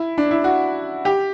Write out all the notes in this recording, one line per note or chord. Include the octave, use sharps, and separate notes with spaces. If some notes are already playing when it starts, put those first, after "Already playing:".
Already playing: E4
D4
E4
F#4
G4